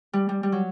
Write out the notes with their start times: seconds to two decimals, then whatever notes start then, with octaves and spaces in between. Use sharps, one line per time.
0.13 G3
0.29 G3
0.43 G3
0.52 F#3